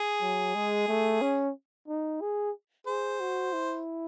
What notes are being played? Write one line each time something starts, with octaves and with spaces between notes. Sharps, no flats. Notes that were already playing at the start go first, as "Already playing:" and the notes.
Already playing: G#4
F#3
G#3
A3
C#4
D#4
G#4
G#4 C5
F#4
E4